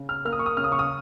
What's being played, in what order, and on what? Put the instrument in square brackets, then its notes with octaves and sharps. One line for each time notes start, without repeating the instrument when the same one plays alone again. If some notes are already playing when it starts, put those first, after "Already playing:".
Already playing: [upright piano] C#3
F6
A#3 F6
D#6
C#6
D#6
C#3 F6
D#6
C#6
D#6